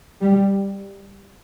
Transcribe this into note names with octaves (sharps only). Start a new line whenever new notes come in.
G3